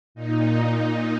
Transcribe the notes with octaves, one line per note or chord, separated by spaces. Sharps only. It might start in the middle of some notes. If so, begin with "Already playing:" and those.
A#2 D#4